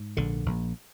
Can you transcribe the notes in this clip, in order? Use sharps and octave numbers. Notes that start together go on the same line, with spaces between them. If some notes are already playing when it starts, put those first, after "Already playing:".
Already playing: G#2
A#1 D3
A#1